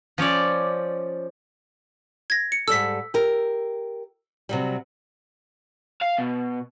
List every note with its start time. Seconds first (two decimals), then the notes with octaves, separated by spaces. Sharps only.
0.18 F3 C#4 C#5 D5
2.30 G#6 A#6
2.52 C#7
2.68 G#2 G3 A4 E6 B6
3.14 G4 A#4
4.49 C3 F#3 G3
6.01 F5
6.18 B2